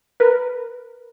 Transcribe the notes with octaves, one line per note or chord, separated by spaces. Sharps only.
A#4 B4